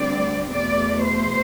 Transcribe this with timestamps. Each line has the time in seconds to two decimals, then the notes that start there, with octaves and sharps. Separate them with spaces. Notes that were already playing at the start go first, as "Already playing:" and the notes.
Already playing: D2 D3 G3 C4 D5
0.50 E2 B2 A3 D5
1.03 C5